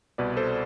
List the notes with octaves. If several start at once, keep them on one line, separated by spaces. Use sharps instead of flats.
C2 B2 B4 D5
A4 C5